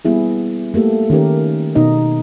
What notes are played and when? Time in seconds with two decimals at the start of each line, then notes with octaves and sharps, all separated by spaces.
0.05 G3 A#3 B3 E4 G#4
0.74 A3 A#3 G4 A4
1.10 D#3 C#4 G4 A#4
1.75 B2 D#4 D#5